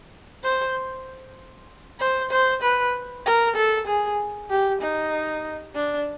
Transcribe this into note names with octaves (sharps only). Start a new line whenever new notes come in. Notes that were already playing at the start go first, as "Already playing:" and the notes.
C5
C5
C5
B4
A#4
A4
G#4
G4
D#4
D4